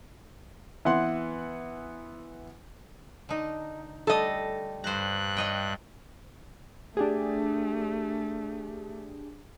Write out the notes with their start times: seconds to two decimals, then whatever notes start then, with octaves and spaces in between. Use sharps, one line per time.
0.85 E3 B3 E4 F#5 C6
3.29 D3 D#4
4.07 G3 A3 A4 D#5
4.84 G2 C5 A#5 F#6
5.37 C#5 D#5 G5
6.97 A3 D4 G4 G#4